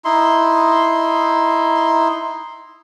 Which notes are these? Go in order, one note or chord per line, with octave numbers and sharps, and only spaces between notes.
D#4 E4 C6